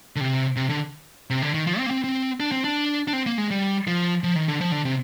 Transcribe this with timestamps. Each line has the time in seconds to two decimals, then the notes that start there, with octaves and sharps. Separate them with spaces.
0.16 D3
0.21 C3
0.56 C3
0.69 D3
1.30 C3
1.42 D3
1.54 D#3
1.67 F3
1.78 C4
1.86 A#3
1.91 C4
2.04 C4
2.40 D4
2.52 C4
2.64 D4
3.08 D4
3.13 C4
3.26 A#3
3.38 G#3
3.51 G3
3.87 F3
4.24 F3
4.35 D#3
4.48 D3
4.61 F3
4.72 D3
4.85 C3